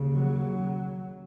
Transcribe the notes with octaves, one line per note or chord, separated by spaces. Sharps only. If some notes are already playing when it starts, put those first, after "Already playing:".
Already playing: D#2 C#3
F#3